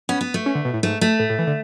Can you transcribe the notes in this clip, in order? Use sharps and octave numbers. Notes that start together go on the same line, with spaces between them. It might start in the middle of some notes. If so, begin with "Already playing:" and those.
B3 C#4
B3
A3
C#4
D3
B2
A2
G#2 A3
A3
A2
A2
E3
D3